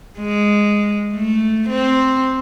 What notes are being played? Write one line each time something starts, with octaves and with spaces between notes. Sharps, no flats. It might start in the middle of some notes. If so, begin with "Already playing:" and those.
G#3
A3
C4